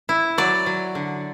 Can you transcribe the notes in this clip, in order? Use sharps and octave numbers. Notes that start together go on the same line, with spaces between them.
E4
F#3 D5
F#3
D3